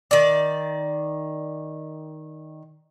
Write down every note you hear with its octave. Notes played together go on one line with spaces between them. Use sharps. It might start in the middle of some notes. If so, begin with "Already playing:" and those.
D#3 D5